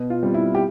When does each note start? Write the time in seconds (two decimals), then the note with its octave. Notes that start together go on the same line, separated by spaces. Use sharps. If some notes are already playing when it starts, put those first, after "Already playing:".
Already playing: B2
0.10 F4
0.23 G3 C4
0.34 E4
0.55 G4